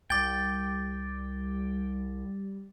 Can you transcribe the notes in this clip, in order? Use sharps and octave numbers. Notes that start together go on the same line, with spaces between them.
C2 G3 G5 D6 A6